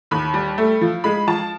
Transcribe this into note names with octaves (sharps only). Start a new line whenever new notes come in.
D#2 B5
G3
A3
F3
G#3 B5
F3 A5